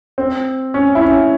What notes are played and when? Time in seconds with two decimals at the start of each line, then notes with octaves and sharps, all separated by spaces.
0.18 C4
0.74 C#4
0.95 E4
1.01 C#4